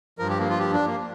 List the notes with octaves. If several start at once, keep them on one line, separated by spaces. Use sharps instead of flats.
G2 F3 A#4
G4
A#3
F4
G4
D4
A#3